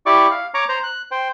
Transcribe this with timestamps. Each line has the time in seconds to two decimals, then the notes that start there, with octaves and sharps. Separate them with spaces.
0.06 E4 G4 D5 C#6 D6
0.31 F5
0.54 C#5 A#5 C#6 D6
0.69 C5 A#5
0.83 F#6
1.11 C5 G5